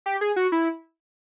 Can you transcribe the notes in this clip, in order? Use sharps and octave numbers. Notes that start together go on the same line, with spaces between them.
G4
G#4
F#4
E4